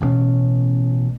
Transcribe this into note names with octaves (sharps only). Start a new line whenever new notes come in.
A1 G2 B2 C#4